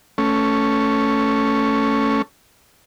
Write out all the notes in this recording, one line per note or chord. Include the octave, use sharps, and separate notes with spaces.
A3 C#4